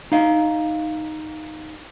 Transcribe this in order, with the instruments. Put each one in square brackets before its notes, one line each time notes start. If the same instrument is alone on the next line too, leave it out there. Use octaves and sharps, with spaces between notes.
[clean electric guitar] D#4 F5